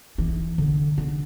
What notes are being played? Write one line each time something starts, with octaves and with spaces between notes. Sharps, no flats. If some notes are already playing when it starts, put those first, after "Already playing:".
E3
D3
D3